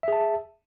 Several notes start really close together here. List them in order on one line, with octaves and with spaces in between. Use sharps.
E5 G#4 A5